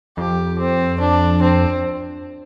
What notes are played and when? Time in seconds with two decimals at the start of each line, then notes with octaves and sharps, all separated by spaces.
0.17 F2 G4
0.59 C4
1.00 D4
1.42 C4